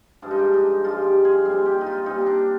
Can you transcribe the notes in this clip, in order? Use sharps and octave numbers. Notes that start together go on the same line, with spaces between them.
G2 F3 G#3 D4
D#4
D4
D#4
G2 F3 G#3 F4
G4
G#4
A#2 G3 C4
G4
D#4
F4
A#2 G3 C4 D#4
D4